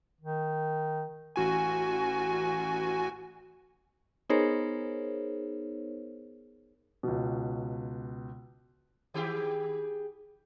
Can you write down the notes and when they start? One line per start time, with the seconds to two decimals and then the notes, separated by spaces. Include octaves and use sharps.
0.21 D#3
1.36 A1 F#4 G#5
4.29 B3 D#4 G#4 A#4 C5 C#5
7.03 C#2 B2
9.14 D#3 G4 G#4